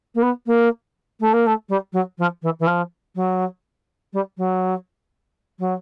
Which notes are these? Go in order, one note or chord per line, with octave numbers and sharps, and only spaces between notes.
A#3
B3
A#3
A3
A#3
A3
G3
F#3
F3
E3
E3
F3
F#3
G3
F#3
F#3